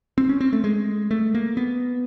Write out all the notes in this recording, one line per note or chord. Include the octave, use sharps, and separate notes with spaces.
C4
C#4
C4
A3
G#3
A3
A#3
B3